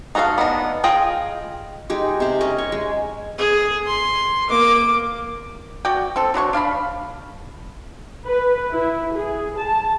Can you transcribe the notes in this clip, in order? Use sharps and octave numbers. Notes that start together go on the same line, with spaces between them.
D#4 F#4 A4 E5 F5
B3 D4 D#4
F4 G#4 D#5 G5
G#3 D#4 G4
C3 C5
C#4 D#5 A#5
C#5
G#3
G#4
C6
A#3 D6
F#4 D5 F#5 G5
C4 A4
F#3 D4 B4 C#6
D4 F5 A5 B5
B4
E4
G#4
A5